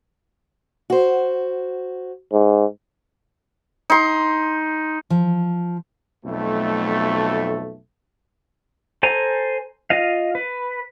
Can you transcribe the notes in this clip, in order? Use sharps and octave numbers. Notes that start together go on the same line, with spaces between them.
F#4 C5
G#2
D#4 C6
F3
B1 F2 B2 A3
A4 C5 G#5 A#5
F4 D#5 F5
B4